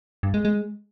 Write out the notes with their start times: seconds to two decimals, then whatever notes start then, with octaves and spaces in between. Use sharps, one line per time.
0.23 G2
0.34 G#3
0.45 G#3